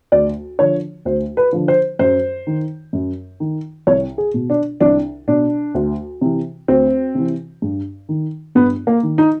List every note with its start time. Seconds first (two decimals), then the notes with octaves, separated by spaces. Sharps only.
0.12 D2 D5
0.59 D3 F3 C#5
1.05 D2 C5
1.37 B4
1.53 D3 F3
1.68 C5
1.99 F#2 C5
2.47 D#3
2.93 F#2
3.40 D#3
3.87 C2 C#5
4.18 G#4
4.34 B2
4.50 D4
4.80 C2 D4
5.27 B2 D4
5.75 D2
6.21 C3 E3
6.68 D2 C4
7.15 C3 E3
7.62 G2
8.09 D#3
8.55 G2 B3
8.87 A#3
9.03 D#3
9.18 D#4